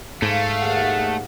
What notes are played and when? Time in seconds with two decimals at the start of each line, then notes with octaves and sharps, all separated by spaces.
0.22 G#2 A3 F5
0.61 D#2 G#4 F#5